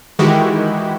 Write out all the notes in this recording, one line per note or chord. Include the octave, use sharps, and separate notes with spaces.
D#3 E3 G#3 E4 F#4 G4